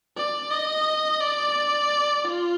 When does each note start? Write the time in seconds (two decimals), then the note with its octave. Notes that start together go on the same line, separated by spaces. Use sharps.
0.17 D5
0.51 D#5
1.20 D5
2.25 F4